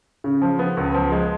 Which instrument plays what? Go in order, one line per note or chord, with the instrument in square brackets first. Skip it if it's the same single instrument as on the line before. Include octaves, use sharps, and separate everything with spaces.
[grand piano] C#3
F3
B3
C#2
F3
G#3